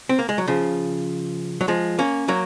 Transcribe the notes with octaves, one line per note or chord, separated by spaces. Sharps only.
C4
A#3
G#3
F#3
C#3 F3
F#3
F3 G#3
A#3 C#4
F#3 A#3